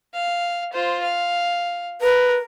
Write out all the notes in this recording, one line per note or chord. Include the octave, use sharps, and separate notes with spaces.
F5
F4 C5
F5
A#4 B4